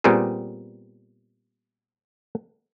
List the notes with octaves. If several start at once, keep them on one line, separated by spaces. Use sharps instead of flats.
A#2 G3 B3 C4 G#4